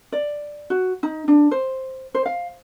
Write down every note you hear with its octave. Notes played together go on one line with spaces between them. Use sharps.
D5
F#4
D#4
D4
C5
C5
F5